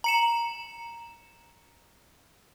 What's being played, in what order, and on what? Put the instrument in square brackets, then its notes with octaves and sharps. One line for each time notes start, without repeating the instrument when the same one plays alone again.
[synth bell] A#5 C#7 E7